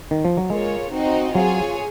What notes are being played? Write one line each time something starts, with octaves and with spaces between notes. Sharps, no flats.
D#3
F3
F#3
G#3 A#3 F4 G#4 C#5
C4 D#4 F#4 C5 D#5
F#3 F4 G#4 C#5 G#5